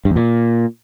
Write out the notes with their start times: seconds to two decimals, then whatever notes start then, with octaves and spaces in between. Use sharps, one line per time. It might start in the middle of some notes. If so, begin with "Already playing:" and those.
0.05 G2
0.11 E2
0.16 A#2